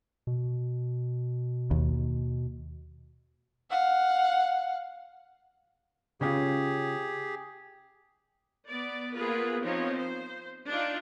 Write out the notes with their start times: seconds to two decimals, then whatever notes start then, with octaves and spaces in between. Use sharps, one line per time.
0.27 B2
1.71 D#2
3.70 F5 F#5
6.21 C#3 C#4 F4 G4 G#4
8.68 B3 D5
9.16 A#3 B3 F4 G#4 A#4 B4
9.62 F3 B3 C4 D#4 C#5
9.98 C5
10.69 D4 D#4 F4 D5